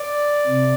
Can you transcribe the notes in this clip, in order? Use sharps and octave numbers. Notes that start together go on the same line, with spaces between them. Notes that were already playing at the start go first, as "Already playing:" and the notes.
Already playing: D5
C3